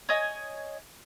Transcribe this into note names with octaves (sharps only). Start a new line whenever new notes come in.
C#5 D#5 G#5